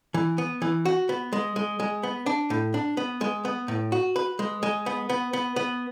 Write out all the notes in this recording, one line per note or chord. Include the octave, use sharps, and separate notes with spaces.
E3
B3
E3
F#4
B3
G#3
G#3
G#3
B3
D4
A2
D4
B3
G#3
B3
A2
F#4
B4
G#3
G#3
B3
B3
B3
B3